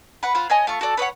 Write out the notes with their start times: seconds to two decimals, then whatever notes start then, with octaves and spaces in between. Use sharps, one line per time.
0.23 B4 F#5
0.35 F4 C5 F#5
0.50 C#5 D#5 G#5
0.67 A3 F4 C#6
0.81 F#4 A4 D5
0.97 B4 C#5 D#5 F#5